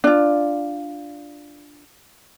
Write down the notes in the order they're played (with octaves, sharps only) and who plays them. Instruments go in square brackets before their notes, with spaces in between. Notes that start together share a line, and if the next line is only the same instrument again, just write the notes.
[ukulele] D4 F4